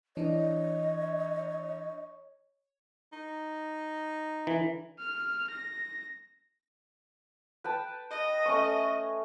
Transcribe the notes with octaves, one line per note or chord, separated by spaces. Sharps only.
E3 D4 C#5 D#5
D#4
E3
F6
A#6
B4 G5 A5
D#5
A3 C#4 C#6